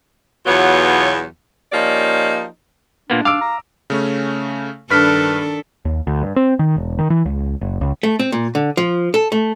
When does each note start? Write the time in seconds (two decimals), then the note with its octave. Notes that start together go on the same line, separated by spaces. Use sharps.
0.46 E2 B2 F#3 B3 F4 C#5
1.72 F3 A#3 C#4 D#4 G4 D5
3.10 A#2 A#3 B3 D4
3.25 F5 D6 E6 D7
3.42 A#5
3.90 C#3 A3 C#4
4.90 G2 D#3 D4 A4 B4 F6 F#6 B6
5.85 D#2
6.07 D2
6.22 G2
6.36 C4
6.59 D#3
6.76 E1
6.99 D#3
7.10 E3
7.25 C#2
7.61 F#1
7.81 C#2
8.03 A3
8.19 C4
8.32 A#2
8.55 D3
8.77 F3
9.14 A4
9.32 A3